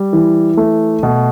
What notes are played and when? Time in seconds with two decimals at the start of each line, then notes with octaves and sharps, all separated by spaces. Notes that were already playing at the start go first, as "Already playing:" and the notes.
Already playing: G3
0.13 E3
0.57 A3
1.03 B2